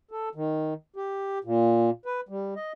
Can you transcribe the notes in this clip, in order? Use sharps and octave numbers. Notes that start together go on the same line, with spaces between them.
A4
D#3
G4
A#2
B4
G3
D#5